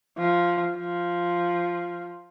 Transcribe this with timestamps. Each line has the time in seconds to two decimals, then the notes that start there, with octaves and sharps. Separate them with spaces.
0.18 F3
0.78 F3